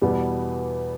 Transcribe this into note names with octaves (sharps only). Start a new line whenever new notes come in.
E2 B2 G3 B3